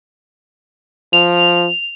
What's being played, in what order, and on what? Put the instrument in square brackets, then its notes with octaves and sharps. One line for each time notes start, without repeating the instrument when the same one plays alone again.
[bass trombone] F3 [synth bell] F7